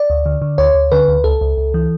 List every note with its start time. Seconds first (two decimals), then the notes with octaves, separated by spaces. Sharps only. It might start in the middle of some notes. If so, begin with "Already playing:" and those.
Already playing: D5
0.10 D2
0.26 D3
0.42 D3
0.58 D2 C#5
0.75 D2
0.92 D3 B4
1.08 D2
1.24 C#2 A4
1.41 C#2
1.57 C#2
1.74 E3